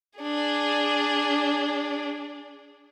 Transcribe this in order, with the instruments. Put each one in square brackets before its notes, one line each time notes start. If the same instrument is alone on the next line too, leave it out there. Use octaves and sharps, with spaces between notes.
[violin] D4 G#4